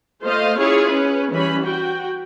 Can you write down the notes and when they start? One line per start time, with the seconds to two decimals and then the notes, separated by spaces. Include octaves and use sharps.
0.24 A3 F4 C5 D#5 F5
0.58 C#4 E4 F4 G#4 C#5
0.90 C#4 B4
1.32 E3 G3 C#4 B5
1.63 F#4 G5